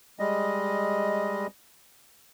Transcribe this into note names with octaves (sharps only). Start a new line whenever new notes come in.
G3 G#3 D#5